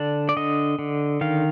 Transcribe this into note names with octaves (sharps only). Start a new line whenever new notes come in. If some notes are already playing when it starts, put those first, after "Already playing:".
Already playing: D3 D4
D5
D3 D#5
D3
D#3 F5